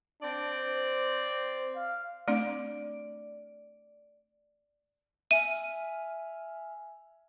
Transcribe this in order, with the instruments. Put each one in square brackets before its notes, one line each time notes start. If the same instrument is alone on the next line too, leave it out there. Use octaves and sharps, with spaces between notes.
[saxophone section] C4 D5 [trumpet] D4
[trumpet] C5
F5
[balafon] A3 C4 D4 [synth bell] D5
[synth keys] E5 G#5 F6 [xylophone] D#7